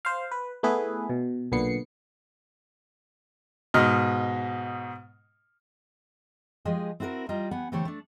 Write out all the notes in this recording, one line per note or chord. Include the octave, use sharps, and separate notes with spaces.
C5 F5
B4
A3 B3 E4 G#4 B4
B2
B1 A#2 D3 B3 C7 C#7
G#2 B2 D#5 F6
F3 G#3 G4 G#4 D#5
C4 E4 F#4 A4 A#4
G3 F4 D#5 A#5
B3 G4 F#5 G#5
D3 E3 A3 G4 C5 C#5
A3 D4